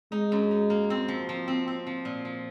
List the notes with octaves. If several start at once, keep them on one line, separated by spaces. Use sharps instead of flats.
G#3 D#4
F#2
D#4
A#3
C4
F3
F3
C4
C4
F3
A#2
F3